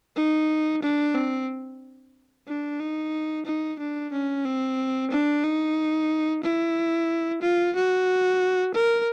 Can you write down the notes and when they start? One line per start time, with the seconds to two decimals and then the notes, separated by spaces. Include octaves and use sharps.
0.16 D#4
0.82 D4
1.15 C4
2.47 D4
2.80 D#4
3.46 D#4
3.79 D4
4.12 C#4
4.45 C4
5.11 D4
5.44 D#4
6.43 E4
7.42 F4
7.75 F#4
8.74 A#4